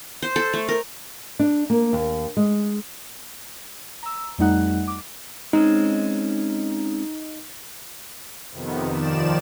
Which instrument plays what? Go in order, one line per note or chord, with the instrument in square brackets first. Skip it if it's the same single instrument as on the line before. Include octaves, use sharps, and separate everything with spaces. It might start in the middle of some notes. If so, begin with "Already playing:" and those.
[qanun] C5
A4
A3
A#4
[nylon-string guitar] D4
A#3
D#2
G#3
[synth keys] A#5 E6
F2 G3 A3 D#4 F#5 F#6
D6
[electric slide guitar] G#3 C4 C#4 [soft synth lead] D#4
[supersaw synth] F2 C3 D#3 B3
D#2 D#3 F3 D5 E7